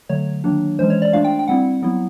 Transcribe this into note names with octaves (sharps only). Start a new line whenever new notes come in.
D3 F#3 A3 C#5
D#3 F#3 A#3 D4
E3 G#3 C#4 C5
C#5
D5
A3 D4 F4 F5
G5
G5
G3 C4 E4 F#5
F#3 B3 E4